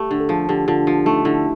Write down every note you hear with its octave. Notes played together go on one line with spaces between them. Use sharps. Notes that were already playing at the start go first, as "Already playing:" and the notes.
Already playing: A3 G4
D3
A4
F3 G#4
D3 G4
D3 F4
F3
A3 D#4
D3 E4